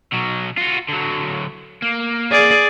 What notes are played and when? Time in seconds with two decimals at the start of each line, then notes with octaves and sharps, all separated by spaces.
0.12 B2 F#3
0.58 F4 F#4
0.89 D3 F#3
1.82 A#3
2.31 G#4 D5